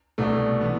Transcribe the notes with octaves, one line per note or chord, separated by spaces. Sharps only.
C2 B2 A3 D4
E3 B3